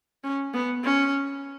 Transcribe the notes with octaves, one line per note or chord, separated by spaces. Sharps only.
C#4
B3
C#4